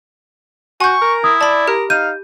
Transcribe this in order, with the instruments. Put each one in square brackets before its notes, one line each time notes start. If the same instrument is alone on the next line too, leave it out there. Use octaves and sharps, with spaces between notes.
[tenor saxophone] F#4 [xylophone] G#5 G6 [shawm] C#6
[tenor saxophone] A#4
[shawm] E4 [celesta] D#6
[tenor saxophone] D5 [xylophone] A5 B5
[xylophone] G4 [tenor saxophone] A#4
[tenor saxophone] D#4 [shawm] F5 [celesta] G6 [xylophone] D#7